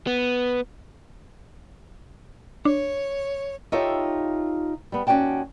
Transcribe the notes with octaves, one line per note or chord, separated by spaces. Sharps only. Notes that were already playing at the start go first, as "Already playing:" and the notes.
B3
D4 C#5
D#4 F4 G4 A4 C#5 E5
G3 B3
D#2 C#4 F#4 D5 G5 A5